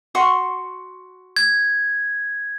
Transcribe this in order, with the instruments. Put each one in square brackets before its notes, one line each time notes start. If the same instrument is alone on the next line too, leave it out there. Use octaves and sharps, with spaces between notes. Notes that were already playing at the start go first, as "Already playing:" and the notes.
[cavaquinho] F#4 C6 C#6
[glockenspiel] G#6